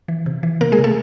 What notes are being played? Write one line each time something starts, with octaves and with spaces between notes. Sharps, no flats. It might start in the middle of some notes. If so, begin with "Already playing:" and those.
E3
C3
E3
C3 A#3 A#4
G#3 G#4
C3
A3 A4